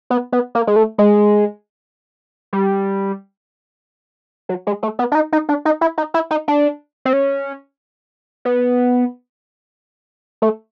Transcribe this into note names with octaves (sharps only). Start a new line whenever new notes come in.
B3
B3
A#3
G#3
A3
G#3
G3
F#3
G#3
A3
B3
D4
D#4
D#4
D4
D#4
E4
D#4
E4
D#4
D4
C4
C#4
B3
A3